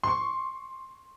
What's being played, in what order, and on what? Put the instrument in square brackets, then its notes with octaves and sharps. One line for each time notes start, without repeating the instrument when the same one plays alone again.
[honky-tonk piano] C6 C#6